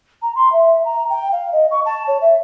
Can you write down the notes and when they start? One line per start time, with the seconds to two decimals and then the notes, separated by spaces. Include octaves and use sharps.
0.22 A#5
0.35 C6
0.52 E5
0.85 A#5
1.10 G5
1.32 F5
1.52 D#5
1.71 C#6
1.85 A5
2.07 C#5
2.21 E5